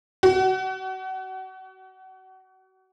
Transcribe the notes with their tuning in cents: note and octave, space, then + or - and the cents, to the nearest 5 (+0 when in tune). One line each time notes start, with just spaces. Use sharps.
F#4 +35